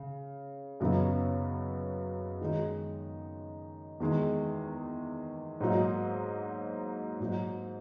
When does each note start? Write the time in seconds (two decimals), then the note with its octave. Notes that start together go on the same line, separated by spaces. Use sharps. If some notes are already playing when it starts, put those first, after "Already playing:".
Already playing: C#3
0.80 F#2 C#3 F#3 B3 D#4
2.41 D#3 G#3 D#4
4.00 E2 D#3 G#3
5.60 G#2 F#3 A#3 D#4
7.20 G#2 F#3 A#3 D#4